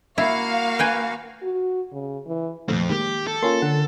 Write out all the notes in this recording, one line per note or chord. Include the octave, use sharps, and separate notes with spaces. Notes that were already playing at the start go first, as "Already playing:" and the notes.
A#3 E4 F#4 F5
B4 G5 G#5
F#4
C#3
E3
F2 A#2 D#3 A3 C4
D#3 G#3 A#3 G4
A4
A#3 C#4 F4 C6
D3 F#5